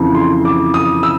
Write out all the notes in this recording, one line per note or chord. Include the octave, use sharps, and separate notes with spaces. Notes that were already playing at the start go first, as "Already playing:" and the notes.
Already playing: F2 C#3 E3
C6
D6
D#6
E6